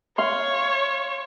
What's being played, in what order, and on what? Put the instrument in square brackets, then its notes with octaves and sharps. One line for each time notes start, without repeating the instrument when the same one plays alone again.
[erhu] C#5 [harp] F5 C6